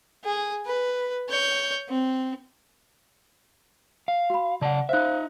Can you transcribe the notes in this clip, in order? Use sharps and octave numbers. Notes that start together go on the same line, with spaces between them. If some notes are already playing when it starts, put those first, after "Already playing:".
G#4
B4
C#5 G6
C4
F5
F#4 B5
C#3 D5 F#5 A5
D#4 C5 E5 F5 F#6